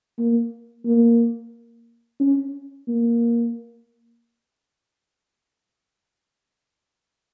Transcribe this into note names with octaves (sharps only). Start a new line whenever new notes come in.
A#3
A#3
C#4
A#3